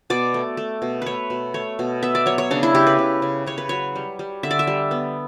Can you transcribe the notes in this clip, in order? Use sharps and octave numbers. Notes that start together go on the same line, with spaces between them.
B2 D5
A3
A3
B2
A3 B4 C#5
B2
A3 C#5
B2
B3 E5
D5
F#3 C#5
C#5
C#3 D4
E4
C#3 G4
B4
C#3
C#3
C#3 C#5
B4
F#3 C#5
G3
G3
D3 E5
D5
E5
G3
B3